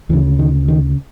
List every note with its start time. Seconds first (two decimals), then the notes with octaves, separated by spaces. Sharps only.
0.09 D2 C#3 E3
0.39 D#3
0.68 D#3